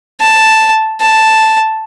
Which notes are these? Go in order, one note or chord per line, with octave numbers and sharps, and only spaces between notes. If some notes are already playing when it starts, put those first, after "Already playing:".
A5
A5